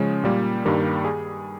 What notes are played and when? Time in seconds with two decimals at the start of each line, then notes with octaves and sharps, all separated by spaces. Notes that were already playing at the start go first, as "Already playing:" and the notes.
Already playing: C#3 F3 G#3 C#4
0.24 A#2 G3 A#3
0.65 G2 D#3 G3 A#3
1.05 G#4